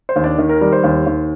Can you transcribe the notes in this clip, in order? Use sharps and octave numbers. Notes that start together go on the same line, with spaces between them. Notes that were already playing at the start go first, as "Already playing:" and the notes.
C5
D#2
D4 D5
D#3
A#4
G3 A#4
C5
D#2
D#2